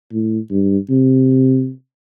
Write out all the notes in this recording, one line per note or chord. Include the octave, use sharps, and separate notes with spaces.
A2
G2
C3